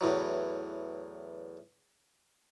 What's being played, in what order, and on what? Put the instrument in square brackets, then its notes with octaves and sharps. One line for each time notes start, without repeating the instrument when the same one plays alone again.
[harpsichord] E2 A2 E3 F#3